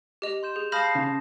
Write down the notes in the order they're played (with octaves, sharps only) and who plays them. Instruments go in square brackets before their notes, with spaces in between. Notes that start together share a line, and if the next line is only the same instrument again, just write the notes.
[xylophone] G4 D#5 F7
[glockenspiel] C6 G6 E7
[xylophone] G#4
[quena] F5 [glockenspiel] A5 D#6 A#6 [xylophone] B5 F6 G6
[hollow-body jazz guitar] C#3